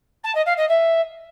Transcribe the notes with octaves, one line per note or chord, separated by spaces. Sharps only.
A5
D#5
F5
D#5
E5